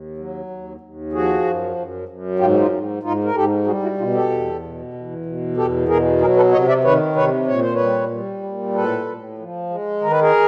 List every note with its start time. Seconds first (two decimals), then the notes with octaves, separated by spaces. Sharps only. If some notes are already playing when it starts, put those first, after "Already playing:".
Already playing: D#2
0.17 F#3
0.50 D#2
0.81 D#2
1.12 F3 F#4 G#4
1.44 F#2
1.76 F#2
2.09 F#2
2.39 G#2 F4 G4
2.60 D#4 F4
2.71 G#2
3.03 G#2 D#4 F4
3.24 A#4
3.35 G#2 G4 A4
3.66 G3 F#4 G#4
3.83 E4 F#4
3.98 B2 D#4 F4
4.14 G4 A4
4.30 E2
4.62 B2
4.94 E2
5.26 B2
5.57 E2 G4 A4
5.88 B2 G#4 A#4
6.20 F#3 G#4 A#4
6.36 A4 B4
6.52 C3 C#5 D#5
6.68 D5 E5
6.84 D#3 B4 C#5
7.15 C3 B4 C#5
7.47 A#2 C#5
7.61 C5
7.74 B4 C#5
7.79 G3
8.10 G3
8.43 A#2
8.74 A2 A4 B4
9.06 A2
9.38 F3
9.70 G#3
10.01 D#3 A#4
10.10 B4
10.21 G#4 A#4